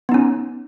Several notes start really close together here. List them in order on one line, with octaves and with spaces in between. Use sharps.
B3 D#4 C#4